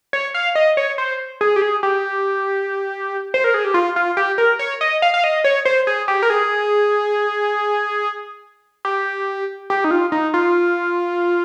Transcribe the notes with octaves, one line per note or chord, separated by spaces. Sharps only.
C#5
F5
D#5
C#5
C5
G#4
G4
G#4
G4
C5
A#4
G#4
G4
F4
F4
G4
A#4
C#5
D#5
F5
F5
D#5
C#5
C5
G#4
G4
A#4
G#4
G4
G4
D#4
F4
D#4
F4